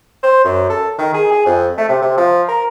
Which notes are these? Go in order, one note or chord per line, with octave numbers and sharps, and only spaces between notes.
C5
F#2
A4
D#3
G#4
G#4
F2
A3
C3
C3
F3
A#4